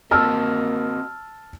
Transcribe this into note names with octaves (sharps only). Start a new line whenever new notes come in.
A#3 C4 F#4 D#5 A5 E6 F6